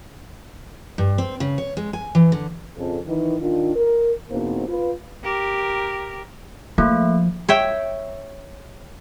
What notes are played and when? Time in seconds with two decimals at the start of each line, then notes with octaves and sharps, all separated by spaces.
0.98 G2
1.18 C4
1.40 C#3
1.58 C#5
1.77 G#3
1.93 G#5
2.15 E3
2.32 D3
2.77 F2 C#3 A4
3.07 D#3 E3
3.41 D#3 D4 F4
3.76 A#4
4.31 E2 B2 A#3 C4 D#4 C5
4.68 F4 B4
5.24 G4 A#4
6.78 F3 A3 A#3
7.49 C#5 E5 G5